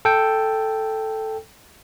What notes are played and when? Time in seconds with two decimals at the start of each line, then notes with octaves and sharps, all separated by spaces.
0.05 A4 G5